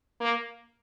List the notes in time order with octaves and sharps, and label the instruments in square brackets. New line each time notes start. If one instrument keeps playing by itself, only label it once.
[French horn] A#3